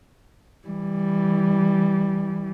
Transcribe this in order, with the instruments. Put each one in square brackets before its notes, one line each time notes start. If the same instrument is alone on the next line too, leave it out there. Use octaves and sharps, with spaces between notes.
[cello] E3 G3